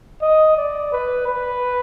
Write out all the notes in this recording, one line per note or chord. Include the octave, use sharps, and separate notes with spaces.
D#5
D5
B4
B4